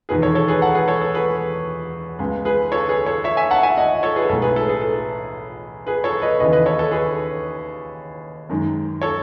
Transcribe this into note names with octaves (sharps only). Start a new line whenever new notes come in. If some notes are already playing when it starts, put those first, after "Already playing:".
E1 E2 D#3 G#4 B4
A4 C#5
A4 C#5
G#4 B4
F#5 A5
G#4 B4
A4 C#5
A4
G#4 B4
C#2 C#3 G#3 B3
G#4 B4
A4 C#5
G#4 B4
A4 C#5
C#5 E5
E5 G#5
F#5 A5
E5 G#5
D#5 F#5
A4 C#5
G#4 B4
B1 A2 G#3 B3 A4
G#4 B4
A4
G#4
A4
G#4 B4
A4 C#5
B4 D#5
D#2 C#3 E3 B4 D#5
B4 D#5
A4 C#5
A4
G#4 B4
F#2 D#3 G#3
A4 C#5